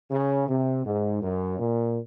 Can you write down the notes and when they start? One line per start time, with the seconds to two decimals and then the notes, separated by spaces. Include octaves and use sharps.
0.11 C#3
0.48 C3
0.85 G#2
1.22 F#2
1.59 A#2